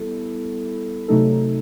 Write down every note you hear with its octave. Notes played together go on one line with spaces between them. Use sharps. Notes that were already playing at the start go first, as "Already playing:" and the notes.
Already playing: G3 B3 E4 A4
C3 F#3 A3 D#4 A4